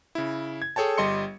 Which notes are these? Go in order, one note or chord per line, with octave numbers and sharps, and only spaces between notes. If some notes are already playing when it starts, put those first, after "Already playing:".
C#3 E4
G#6
G#4 A4 C#5 G5 A5
G1 G3 D#5 C6 C#7